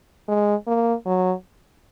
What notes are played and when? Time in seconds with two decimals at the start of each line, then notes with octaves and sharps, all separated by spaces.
0.28 G#3
0.67 A#3
1.06 F#3